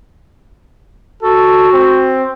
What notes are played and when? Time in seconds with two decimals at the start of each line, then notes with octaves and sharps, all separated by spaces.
1.23 F#4 A4
1.73 C4